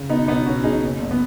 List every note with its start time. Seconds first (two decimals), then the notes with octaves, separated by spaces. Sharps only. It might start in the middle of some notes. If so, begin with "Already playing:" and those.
Already playing: C#3
0.09 B2 B3 D#4
0.27 B1 B3 D#4
0.45 B2 C#4 F#4
0.63 B1 D#4 G#4
0.81 F#1
1.00 F#1
1.11 B3